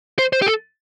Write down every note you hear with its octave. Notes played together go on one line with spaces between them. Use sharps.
C5
C5
G4
A4